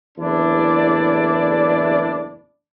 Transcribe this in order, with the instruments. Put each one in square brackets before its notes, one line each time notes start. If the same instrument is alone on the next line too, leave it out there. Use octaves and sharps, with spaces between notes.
[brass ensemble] F#1 E2 A2 D4 E4 D5